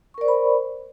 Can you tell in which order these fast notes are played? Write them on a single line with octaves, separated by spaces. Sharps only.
C#6 A#4 D5 C5 B5